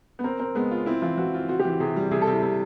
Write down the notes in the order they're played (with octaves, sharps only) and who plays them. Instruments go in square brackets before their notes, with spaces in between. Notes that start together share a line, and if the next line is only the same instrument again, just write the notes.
[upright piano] B3
[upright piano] C4 [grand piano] A#4
[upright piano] C4 [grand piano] A#4
[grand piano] G#3 [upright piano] B3
[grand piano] F4
[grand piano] C4 [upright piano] E4
[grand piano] E3 [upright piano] F4
[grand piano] E3 [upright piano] F#4
[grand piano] F4
[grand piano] C4 [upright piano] F#4
[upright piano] G4
[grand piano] E3
[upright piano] F#4
[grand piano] C3 [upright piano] G#4
[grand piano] G3
[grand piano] C3 [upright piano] G#4
[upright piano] A4
[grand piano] C3
[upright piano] E4
[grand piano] C3